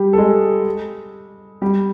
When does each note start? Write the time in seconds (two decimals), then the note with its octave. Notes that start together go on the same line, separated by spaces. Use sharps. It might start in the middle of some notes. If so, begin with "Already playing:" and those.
Already playing: G3 G4
0.13 A4
0.18 G#3 G#4
1.62 G3 G4